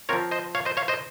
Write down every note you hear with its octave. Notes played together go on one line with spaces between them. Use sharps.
F3 C4 F4 A#4 C#5
C5 D#5
C#5 F5
C5 D#5
C#5 F5
C5 D#5